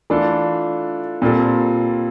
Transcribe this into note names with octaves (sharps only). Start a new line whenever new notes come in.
E3 A3 D4 F4 A4
A#2 G3 C4 F4 A4